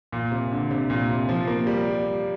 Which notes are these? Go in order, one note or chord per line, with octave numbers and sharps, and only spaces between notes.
A#2
C3
D3
C3
A#2
C3
F3
A#3
G3